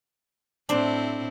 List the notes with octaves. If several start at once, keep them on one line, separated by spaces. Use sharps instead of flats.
A2 C4 D4 E4 C5